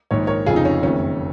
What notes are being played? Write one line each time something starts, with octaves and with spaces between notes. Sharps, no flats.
A#1 G#2 D#3 C#5
A#4 C#5
F1 F2 C#3 F4 G#4
D#4
C#4
F#1 F2 D#3 C#4